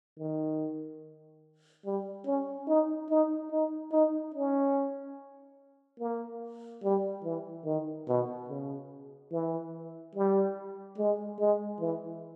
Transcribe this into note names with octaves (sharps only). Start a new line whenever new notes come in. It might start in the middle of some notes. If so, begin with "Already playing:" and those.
D#3
G3
C#4
D#4
D#4
D#4
D#4
C#4
A#3
G3
E3
D#3
B2
C#3
E3
G3
G#3
G#3
E3